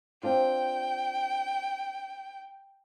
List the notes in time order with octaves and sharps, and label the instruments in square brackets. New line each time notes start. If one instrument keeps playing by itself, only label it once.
[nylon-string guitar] C4 D4 F4 [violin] G5